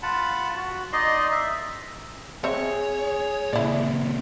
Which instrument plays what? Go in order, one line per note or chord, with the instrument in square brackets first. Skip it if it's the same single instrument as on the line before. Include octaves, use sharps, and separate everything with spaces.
[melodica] F4 F#5 A5 B5
F#4
D#4 D5 D#5 C6
E5
[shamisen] C4 E5 [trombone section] G#4 [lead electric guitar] C#5
[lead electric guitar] A#2 C#3 [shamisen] E4 D5